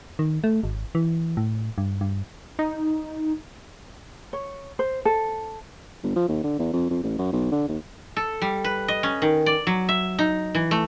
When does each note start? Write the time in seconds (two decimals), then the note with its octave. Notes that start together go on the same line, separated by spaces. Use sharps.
0.19 D#3
0.44 A3
0.63 G#1
0.95 E3
1.37 A2
1.78 G2
2.01 G2
2.59 D#4
4.33 C#5
4.79 C5
5.05 A4
6.03 G1
6.16 F3
6.28 D#2
6.44 D3
6.59 E2
6.73 F2
6.90 F2
7.03 A1
7.18 F#2
7.33 B1
7.52 D3
7.68 D#2
8.16 A4
8.42 G3
8.64 B4
8.88 D#5
9.03 C#4
9.22 D#3
9.46 D5
9.67 F#3
9.89 E5
10.19 D#4
10.55 E3
10.71 A3